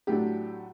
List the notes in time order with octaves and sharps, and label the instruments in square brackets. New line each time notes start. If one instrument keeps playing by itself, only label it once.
[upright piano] A2 F#3 A3 D4 G4